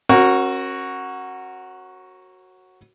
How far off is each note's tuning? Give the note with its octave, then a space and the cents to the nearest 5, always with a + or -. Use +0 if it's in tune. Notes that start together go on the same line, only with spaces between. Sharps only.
C#4 -40 F#4 +0 A#4 +0